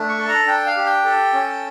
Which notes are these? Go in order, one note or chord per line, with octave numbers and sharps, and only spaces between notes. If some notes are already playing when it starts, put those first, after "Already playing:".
Already playing: A3 D4
C#6
A4
A#5
D4 G5
F5
G4
G5
A4
C#4